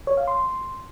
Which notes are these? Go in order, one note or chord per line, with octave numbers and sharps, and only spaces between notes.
C#5
F5
C6